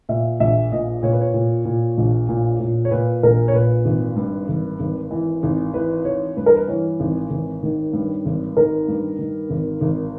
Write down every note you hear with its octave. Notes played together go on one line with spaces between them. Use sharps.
A#2 E5
A#1 E5
A#2 D#5
A#2 C#5
B4
C#5
A#2
A#2
A#1
A#2
A#2
C#5
A#2 B4
A#1 A#4
C#5
A#2 B4
G#1
G2
G#1
G#1
E3
G#1
E3 B4
E3 C#5
G2 B4
A#4
B4
E3 C#5
G#1
G#1
D#3
G2
G#1
D#3 A#4
G2
D#3
G#1
G#1